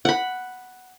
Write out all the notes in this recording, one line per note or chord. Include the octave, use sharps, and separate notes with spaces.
F#5 B5